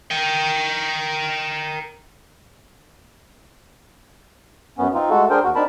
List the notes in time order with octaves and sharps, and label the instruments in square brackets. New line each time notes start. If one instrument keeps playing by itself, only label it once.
[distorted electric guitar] A#4 G5
[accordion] F#2 B3 C#4
C4 D#4 F4
G#3 A3 F#4 A4
D4 G#4 A#4 C5 G5
D#2 F#4
C4 D4 D#4 A#4 A5 B5